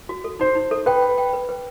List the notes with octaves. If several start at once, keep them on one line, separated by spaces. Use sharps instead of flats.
F#4
A4
D#4 C5
D#4
A4
B4 G5
G5
G5
B4
B4